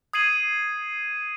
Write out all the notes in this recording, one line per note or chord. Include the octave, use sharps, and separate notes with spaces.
D#6 G#6 C7 D#7 F#7